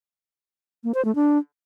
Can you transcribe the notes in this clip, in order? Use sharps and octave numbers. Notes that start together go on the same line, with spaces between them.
A#3
C5
A3
D4